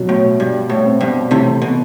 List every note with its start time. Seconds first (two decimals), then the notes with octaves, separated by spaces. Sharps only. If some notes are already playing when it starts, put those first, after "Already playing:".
Already playing: B2 F#3
0.09 A2
0.39 G2 G3
0.70 A2
0.85 C4
1.01 G2 B2
1.31 A2 C3 E3
1.62 B2